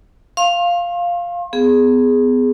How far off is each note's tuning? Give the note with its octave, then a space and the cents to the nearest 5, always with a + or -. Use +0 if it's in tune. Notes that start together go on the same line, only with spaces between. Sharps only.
F5 +0 C6 +40
B3 +25 G#4 +0